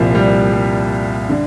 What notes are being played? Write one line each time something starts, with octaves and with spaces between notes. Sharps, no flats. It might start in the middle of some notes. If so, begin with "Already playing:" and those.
Already playing: C2 A#2 F3
G3
G3
D3